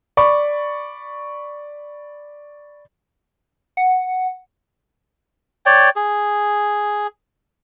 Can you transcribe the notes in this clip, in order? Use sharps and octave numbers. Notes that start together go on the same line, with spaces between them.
D5 B5 C#6
F#5
C#5 D5 G5
G#4